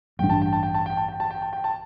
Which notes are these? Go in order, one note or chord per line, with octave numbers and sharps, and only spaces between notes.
A1 G2 G3 D4 G5
A5
G5
A5
G5
A5
G5
A5
G5
A5
G5
A5
G5
A5